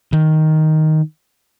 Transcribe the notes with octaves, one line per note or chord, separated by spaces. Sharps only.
D#3